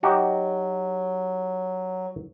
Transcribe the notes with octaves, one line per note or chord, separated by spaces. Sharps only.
F#3 D#4 F#4 G4